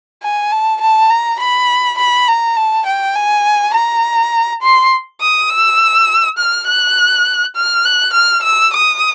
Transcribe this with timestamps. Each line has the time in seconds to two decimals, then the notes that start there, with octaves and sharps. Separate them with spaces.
0.22 G#5
0.52 A5
0.81 A5
1.10 A#5
1.40 B5
1.98 B5
2.28 A#5
2.56 A5
2.86 G5
3.16 G#5
3.74 A#5
4.62 C6
5.21 D#6
5.50 E6
6.38 F6
6.67 F#6
7.56 F6
7.85 F#6
8.14 F6
8.43 E6
8.73 D#6